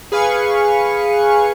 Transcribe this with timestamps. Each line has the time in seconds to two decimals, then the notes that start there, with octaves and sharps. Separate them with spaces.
0.12 G#4 B4 F5 G#5 C#6